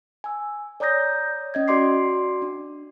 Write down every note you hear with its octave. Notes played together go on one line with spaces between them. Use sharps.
G#5 E6
C#5 D5 A#5 D#6 G6 A#6
C#4 D#5 G#6
F#4 D5 C6 D6 C7
D4